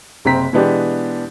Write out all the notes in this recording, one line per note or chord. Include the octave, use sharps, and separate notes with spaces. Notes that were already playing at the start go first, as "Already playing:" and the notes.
F#1 C3 C4 A#5 B6
B2 E3 G#3 B3 D4 G4